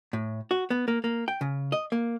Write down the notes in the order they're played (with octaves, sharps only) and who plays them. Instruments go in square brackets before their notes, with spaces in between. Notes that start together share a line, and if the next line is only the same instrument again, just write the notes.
[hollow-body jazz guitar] A2
F#4
B3
A#3
A#3
G5
C#3
D#5
A#3